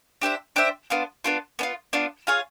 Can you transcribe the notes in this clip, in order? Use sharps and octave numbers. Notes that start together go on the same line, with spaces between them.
D4 G4 C5 E5
D4 G4 C5 E5
B3 D4 F4
B3 D4 F4
B3 D4 F4
B3 D4 F4
F4 G#4 C#5 F5